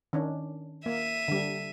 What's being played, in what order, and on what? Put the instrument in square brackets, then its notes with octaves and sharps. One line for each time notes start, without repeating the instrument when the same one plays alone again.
[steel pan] D#3 C#4 D4
[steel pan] A#3 [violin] E5 D#7
[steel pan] D3 G3